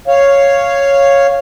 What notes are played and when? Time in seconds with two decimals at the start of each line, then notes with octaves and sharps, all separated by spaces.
0.08 C#5 F5